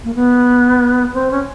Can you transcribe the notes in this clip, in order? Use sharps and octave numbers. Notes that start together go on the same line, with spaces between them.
A#3
B3
C4
C#4